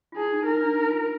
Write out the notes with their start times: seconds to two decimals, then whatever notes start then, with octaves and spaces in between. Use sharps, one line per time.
0.12 F4
0.16 E4 G#4
0.31 D#4
0.46 D#4 A#4
0.61 D4
0.76 D#4
0.90 F4